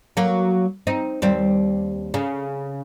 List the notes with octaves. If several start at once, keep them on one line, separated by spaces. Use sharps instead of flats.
F#3 A#3
C4 D#4
D#2 G3 C4
C#3